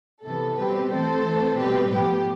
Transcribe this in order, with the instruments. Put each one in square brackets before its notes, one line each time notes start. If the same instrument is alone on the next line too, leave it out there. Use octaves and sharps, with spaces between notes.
[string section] C3 E3 B3 A4
B2 G3 C4 G4 B4
E3 A3 C4 A4 C5
E3 A3 C4
B2 G3 C4 G4 B4
A2 F3 B3 G4